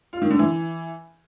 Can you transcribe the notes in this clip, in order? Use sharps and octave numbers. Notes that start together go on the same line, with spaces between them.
F4
D#3
D3
E3